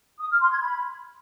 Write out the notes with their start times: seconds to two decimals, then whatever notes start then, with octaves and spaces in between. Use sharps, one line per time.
0.19 D#6
0.30 F6
0.40 C6
0.50 G#6
0.60 B5